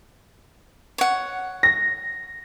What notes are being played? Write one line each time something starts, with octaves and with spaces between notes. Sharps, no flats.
C#5 F#5
A#6